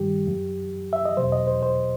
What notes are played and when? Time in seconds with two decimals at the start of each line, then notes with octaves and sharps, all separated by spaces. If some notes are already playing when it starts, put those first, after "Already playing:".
Already playing: G2 D#3 G3 G4
0.27 F#2 F#3
0.93 E5
1.05 D#5
1.17 E2 B2 F#3 C5
1.32 D#5
1.47 C5
1.63 C5